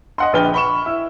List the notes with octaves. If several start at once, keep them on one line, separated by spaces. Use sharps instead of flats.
D#5 F#5 C6
A#1 D3 B4 G5 F6 G7
B5 C#6 E7
E4 E6